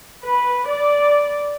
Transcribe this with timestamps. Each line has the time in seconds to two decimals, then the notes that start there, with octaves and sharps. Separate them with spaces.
0.23 B4
0.66 D5